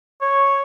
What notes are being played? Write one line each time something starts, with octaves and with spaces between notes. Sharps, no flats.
C#5